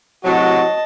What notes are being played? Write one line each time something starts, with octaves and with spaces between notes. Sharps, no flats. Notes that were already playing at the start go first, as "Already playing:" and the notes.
A2 C3 F#3 F#4 D#5 A5